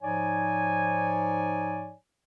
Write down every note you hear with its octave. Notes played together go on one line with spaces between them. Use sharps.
G#2 F3 D#4 C#5 D5 G#5